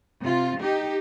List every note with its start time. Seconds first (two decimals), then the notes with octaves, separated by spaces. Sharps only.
0.21 C3 F4
0.60 D#4 G4